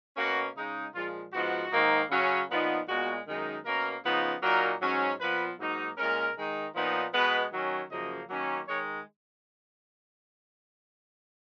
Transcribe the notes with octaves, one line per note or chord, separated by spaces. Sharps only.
B2 A#3 C#4 F#4
C#3 G#3 D#4
A#2 F3 G#3 F4
G#2 F3 B3 D#4 F#4
G#2 D#3 A#3 D#4
C#3 F#3 C#4
A#2 F3 B3 D#4
A#2 G#3 B3 F#4
F#2 D#3 G#3 D#4
B2 A#3 C#4 A#4
C#3 F3 B3 D#4
A#2 F#3 A#3 D#4 A#4
G#2 F#3 C#4
A#2 F3 B3 B4
G#2 F#3 A#3 D#4
A#2 G#3 C#4 A#4
D#3 G#3 D#4
A#2 F3 B3 D#4
B2 G#3 B3 B4
D#3 F#3 C#4
F#2 C#3 F3 A#3 D#5
D#3 F#3 A#3 C#4
D#3 G#3 C#5